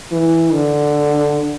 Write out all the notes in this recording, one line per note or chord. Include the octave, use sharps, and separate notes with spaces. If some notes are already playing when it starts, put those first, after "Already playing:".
E3
D3